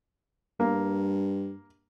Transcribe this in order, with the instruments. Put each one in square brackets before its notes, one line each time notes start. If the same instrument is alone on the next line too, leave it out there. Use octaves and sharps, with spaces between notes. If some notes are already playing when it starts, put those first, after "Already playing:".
[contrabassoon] G2 [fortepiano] A#3